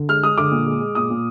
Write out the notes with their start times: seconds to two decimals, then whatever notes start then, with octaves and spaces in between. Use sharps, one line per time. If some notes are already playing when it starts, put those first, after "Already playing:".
Already playing: D3
0.09 G#3 F6
0.23 G#3 D#6
0.38 D3 D6
0.52 A#2
0.67 G#3
0.81 G#3
0.95 A#2 D#6
1.10 A#2